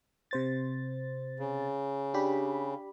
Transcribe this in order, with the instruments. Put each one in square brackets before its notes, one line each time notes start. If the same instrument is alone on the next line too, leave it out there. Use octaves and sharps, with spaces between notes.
[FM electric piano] C3 C5 A6
[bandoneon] C#3
[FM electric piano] D4 G4 B5